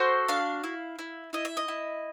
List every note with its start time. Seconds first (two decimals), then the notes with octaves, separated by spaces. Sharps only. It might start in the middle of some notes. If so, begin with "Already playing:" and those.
Already playing: F#4 A4 C5
0.28 D4 F5
0.64 E4
0.99 E4
1.33 E4 D#5
1.45 E5
1.57 D#5
1.68 E4